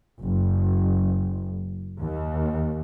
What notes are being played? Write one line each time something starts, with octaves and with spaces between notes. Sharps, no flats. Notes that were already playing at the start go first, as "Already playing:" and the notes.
F#1
D#2